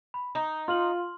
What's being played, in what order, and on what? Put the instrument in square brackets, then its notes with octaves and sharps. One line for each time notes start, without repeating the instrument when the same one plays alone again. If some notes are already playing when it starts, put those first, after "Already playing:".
[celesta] B5
[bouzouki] D#4 [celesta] A#5
[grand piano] F4 [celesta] C6 F6 F#7